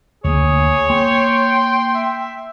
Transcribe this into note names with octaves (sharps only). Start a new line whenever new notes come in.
D2 A#3 G#4 C#5
A#3 G5 C6
E5